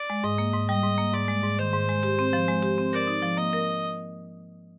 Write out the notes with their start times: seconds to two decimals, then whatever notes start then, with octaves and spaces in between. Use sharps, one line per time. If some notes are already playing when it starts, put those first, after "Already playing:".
Already playing: D5
0.10 G#3
0.24 G#2 D#5
0.38 A#3
0.54 G#2
0.69 G3 D#5
0.83 G#2
0.98 A#3
1.13 G#2 D5
1.28 G#3
1.43 G#2
1.59 D#3 C5
1.73 G#2
1.89 G#3
2.03 G4
2.19 C4
2.33 F3
2.48 G#3
2.63 G4
2.78 C4
2.93 A#4 D5
3.07 D#4
3.22 F3
3.37 A#3 D#5
3.53 A#4